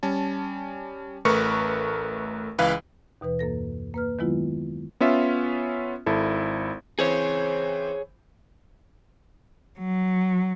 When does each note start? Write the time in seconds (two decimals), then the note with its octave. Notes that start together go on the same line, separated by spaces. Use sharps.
0.03 G3 C#4 A5
1.25 A1 A3 A#4 B4 C#6 C#7
2.58 C#2 E3 B4 F5
3.21 D#2 B2 E3 B4
3.39 F#2 A#3 A4 A#6
3.94 A#3 B4 F6
4.19 D#3 F#3 G#3 B3 E4 F4
5.01 B3 C#4 F4 E5
6.06 G#1 E4 A4
6.99 E3 C4 G#4 C5 C#5
9.80 F#3